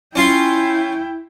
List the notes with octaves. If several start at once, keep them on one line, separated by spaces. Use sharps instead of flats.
C#4 E4 F4 G5 C6